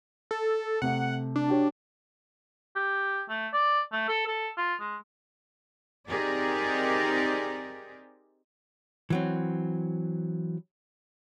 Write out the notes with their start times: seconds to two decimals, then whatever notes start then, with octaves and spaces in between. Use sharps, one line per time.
0.31 A4
0.82 C3 A3 F#5
1.36 D4
1.49 F#4 G4 C#5
2.76 G4
3.29 A3
3.53 D5
3.92 A3
4.09 A4
4.27 A4
4.58 F4
4.80 G#3
6.07 C4 D#4 G4 G#4 A#4 D5
9.10 E3 F#3 C4